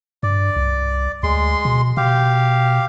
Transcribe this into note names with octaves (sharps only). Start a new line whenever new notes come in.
G2 D5
C2
D2 G#3 C6
B2
B2 G4 F5